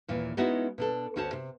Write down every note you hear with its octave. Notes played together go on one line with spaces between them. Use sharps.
D#2 A#2 E3
G#3 B3 C#4 D#4 E4 F#4
B2 D4 A4
D2 C#4 F#4 C5 A5
C3